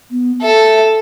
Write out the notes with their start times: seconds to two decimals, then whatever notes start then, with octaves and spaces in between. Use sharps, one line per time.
0.11 B3
0.42 A4 E5